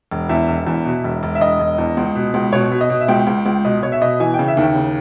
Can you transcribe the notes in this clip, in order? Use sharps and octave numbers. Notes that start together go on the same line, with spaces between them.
E1
E2 E5
E1
E2
B2
E1
E1
E5
E1 D#5
E1
E2
C#2
B2
C#2
B2 C#5
B2
D#5
B2
E5
C#2 G5
C#2
C#2
B2 D#5
B2 C#5
E5
B2 D#5
E3 G#5
G5
C#3
E5
D#2 G5
C#3